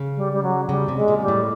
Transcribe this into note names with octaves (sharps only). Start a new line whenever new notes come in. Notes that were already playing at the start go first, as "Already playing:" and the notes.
Already playing: C#3
G3
G3
F#3
C#3 G3
C3
G#3
A#2
G3
A2